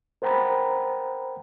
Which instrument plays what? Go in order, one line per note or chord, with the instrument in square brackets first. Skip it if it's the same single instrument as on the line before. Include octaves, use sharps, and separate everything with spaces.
[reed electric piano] A#4 C5 F#5 G5 A#5 B5